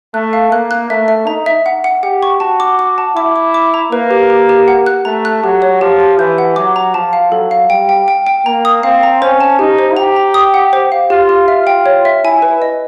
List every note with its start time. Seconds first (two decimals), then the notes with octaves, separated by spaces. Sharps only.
0.14 A3 F#6
0.33 F5
0.52 A#3 F#6
0.71 F#6
0.90 A3 E5
1.08 E5
1.27 D#4 A#5
1.46 E5
1.66 F#5
1.84 F#5
2.03 G4 F#5
2.23 C#6
2.40 F#4 A5
2.60 D6
2.79 D6
2.98 A5
3.16 E4 D6
3.36 D6
3.54 D6
3.74 A#5
3.92 A#3 B4
4.11 G4
4.30 G4
4.49 G4
4.68 F#5
4.86 F#6
5.05 A3 A#5
5.25 F#6
5.44 F#3 G4
5.62 C#5
5.81 F3 G4
6.00 G4
6.19 E3 G6
6.38 F#5
6.56 F#3 D6
6.76 A#5
6.94 F3 A5
7.13 F5
7.32 F#3 A4
7.51 F5
7.70 G3 G5
7.89 G5
8.08 G5
8.27 G5
8.46 A#3 A#5
8.65 D#6
8.83 C4 F5
9.03 A#5
9.22 C#4 C5
9.41 A5
9.59 D#4 G4
9.79 C5
9.97 G4 A#5
10.16 A#5
10.34 D#6
10.54 F#5
10.73 C5
10.92 F5
11.10 F4 G4
11.29 G4
11.48 F4 E5
11.67 G5
11.86 C#5
12.05 E5
12.24 E4 G#5
12.42 B4
12.62 D#5